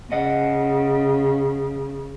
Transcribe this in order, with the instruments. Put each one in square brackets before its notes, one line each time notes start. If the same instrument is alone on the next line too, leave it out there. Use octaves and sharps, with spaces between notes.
[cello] C#3 [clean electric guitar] D#5 F#5